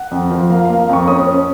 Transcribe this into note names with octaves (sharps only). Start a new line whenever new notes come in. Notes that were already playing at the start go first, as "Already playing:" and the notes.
Already playing: F#5
F2
F3
A#3 F5
F5
A#3
F5
F2 C#6
C#4 D#6
C#4